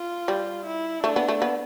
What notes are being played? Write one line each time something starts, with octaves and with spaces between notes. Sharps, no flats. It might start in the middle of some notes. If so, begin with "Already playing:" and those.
Already playing: F4
G3
E4
A3 D4
B3
A3
B3